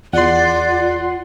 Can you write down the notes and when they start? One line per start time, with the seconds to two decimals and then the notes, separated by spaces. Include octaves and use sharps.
0.13 E2 F4 D5 F#5 C6